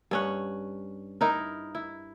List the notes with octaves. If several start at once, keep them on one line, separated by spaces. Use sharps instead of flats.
G2 C#4 F#5
D#4 E4 A#4
E4